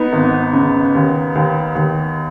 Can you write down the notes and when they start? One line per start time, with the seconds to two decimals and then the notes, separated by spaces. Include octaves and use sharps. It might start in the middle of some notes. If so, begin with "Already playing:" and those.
Already playing: B3 D#4
0.13 G#1
0.53 C#3
0.95 D#2
1.35 D#2
1.75 D#2